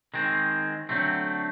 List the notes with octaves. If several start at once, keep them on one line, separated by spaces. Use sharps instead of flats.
D#3 G#3 C4
D3 F#3 A3 C4